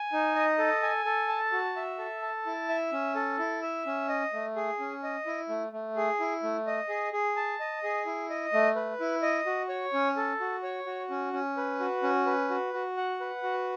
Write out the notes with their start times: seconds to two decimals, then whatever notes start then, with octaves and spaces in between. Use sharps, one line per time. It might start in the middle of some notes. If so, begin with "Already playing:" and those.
Already playing: G#5
0.13 D#4
0.35 D#5
0.58 A4
0.82 G#5
1.05 A4
1.28 A5
1.52 F#4
1.76 E5
1.99 A4
2.22 A5
2.46 E4
2.69 E5
2.92 C#4
3.15 A4
3.39 E4
3.62 E5
3.86 C#4
4.09 D#5
4.33 A3
4.56 G#4
4.79 C#4
5.03 D#5
5.26 E4
5.49 A3
5.72 A3
5.96 G#4
6.20 E4
6.43 A3
6.67 D#5
6.89 G#4
7.13 G#4
7.36 A5
7.60 D#5
7.83 G#4
8.06 E4
8.30 D#5
8.53 A3
8.76 B4
9.00 E4
9.22 D#5
9.46 F#4
9.69 C#5
9.93 C#4
10.17 A4
10.40 F#4
10.63 C#5
10.87 F#4
11.10 C#4
11.33 C#4
11.57 B4
11.80 F#4
12.03 C#4
12.26 B4
12.50 F#4
12.74 F#4
12.97 F#5
13.21 B4
13.43 F#4